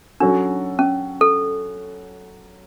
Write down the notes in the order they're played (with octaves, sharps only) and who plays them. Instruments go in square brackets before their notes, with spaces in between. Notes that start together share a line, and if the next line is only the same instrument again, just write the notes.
[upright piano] F#3 C#4 F#4 A4 [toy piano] D4
[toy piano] C#4
A4